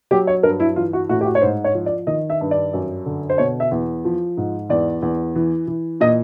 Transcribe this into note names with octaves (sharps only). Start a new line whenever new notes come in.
F#3 G4
C#5
G2 A#4
E4
E3 F4
F#4
A2 F#4
G4
F#4
C#5
G#2 C5
C#5
F3
D5
D#3 D#5
E5
G2
D5
F#2
D3
C5
B2 C#5
E5
E2
F3
G#2
E2 D5
E2
E3
E3
A#2 D#5